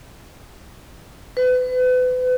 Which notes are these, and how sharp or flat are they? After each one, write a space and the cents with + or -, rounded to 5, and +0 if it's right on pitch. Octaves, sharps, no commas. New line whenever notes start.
B4 +35